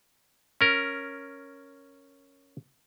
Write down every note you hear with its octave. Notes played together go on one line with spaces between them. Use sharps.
C#4 A#4